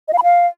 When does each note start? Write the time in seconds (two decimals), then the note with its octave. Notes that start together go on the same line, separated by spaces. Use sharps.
0.08 D#5
0.13 F5
0.18 B5
0.23 F5